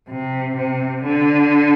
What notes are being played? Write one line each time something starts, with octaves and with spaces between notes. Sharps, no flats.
C3
C3
D3